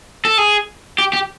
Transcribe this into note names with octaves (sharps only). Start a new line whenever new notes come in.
A4
G#4
G4
G4